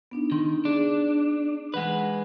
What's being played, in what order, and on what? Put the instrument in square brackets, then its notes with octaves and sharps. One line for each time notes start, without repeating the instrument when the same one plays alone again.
[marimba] B3 D4 D#4
[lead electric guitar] D#3 [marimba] C6
[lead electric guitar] D4 [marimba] G#4
[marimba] E3 F#5 [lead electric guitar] G#3 B4